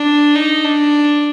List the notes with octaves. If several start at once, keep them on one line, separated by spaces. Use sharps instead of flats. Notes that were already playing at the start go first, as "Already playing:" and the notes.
Already playing: D4
D#4
D4